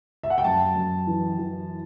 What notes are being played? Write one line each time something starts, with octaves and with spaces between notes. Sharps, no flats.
E5
F#5
G5
F#2 A5
F#2
E3
E3